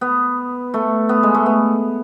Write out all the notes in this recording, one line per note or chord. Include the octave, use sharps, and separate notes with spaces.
B3
A3
B3
G#3
A3
B3